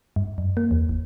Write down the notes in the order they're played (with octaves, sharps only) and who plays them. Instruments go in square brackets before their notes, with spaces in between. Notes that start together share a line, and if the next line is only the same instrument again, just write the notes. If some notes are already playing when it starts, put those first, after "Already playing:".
[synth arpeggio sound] G2
F#2
A#3
E2
G1